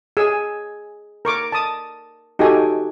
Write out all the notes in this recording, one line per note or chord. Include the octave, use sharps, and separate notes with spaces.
G#4 G#5 E6
A#4 C#6 D6
A5 D#6
D#4 F#4 G4 A4 G#5